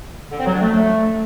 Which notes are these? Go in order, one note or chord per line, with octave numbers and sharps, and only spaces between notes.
D3
C4
F#3
D4
A3